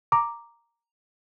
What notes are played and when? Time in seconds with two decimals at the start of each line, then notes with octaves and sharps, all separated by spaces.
0.12 A#5 D6